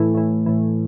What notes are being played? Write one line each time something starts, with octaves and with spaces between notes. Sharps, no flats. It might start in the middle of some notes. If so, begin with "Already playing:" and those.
Already playing: A2 E3 A3
A2 E3
A2 E3